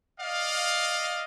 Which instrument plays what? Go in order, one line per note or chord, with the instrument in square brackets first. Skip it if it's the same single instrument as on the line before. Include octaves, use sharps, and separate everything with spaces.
[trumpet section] D5 D#5 F5